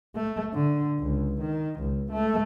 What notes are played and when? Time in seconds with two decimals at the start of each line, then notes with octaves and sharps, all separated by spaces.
0.15 A3
0.53 D3
0.99 C#2
1.40 D#3
1.80 C#2
2.12 A3